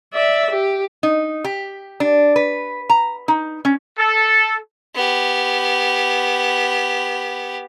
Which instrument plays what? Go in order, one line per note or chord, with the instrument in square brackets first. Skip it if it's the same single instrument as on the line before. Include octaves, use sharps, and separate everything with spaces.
[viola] D5 E5
G4
[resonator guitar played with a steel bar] D#4
G4
D4
B4
A#5
D#4
C#4
[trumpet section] A4
[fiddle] B3 G4